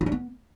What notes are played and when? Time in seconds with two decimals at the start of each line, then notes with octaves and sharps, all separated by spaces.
0.01 F4
0.06 D4
0.12 B3